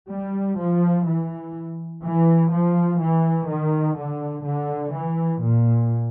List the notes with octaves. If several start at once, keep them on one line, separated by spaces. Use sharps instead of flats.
G3
F3
E3
E3
F3
E3
D#3
D3
D3
E3
A#2